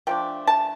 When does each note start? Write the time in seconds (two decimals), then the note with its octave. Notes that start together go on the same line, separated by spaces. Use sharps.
0.07 F3 A3 D4 G5
0.47 A5